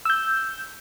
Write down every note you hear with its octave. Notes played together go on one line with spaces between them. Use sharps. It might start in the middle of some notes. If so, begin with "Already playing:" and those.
E6 G6